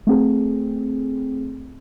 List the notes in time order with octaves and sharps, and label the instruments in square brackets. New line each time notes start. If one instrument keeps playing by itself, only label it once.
[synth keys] A3 C4 G#4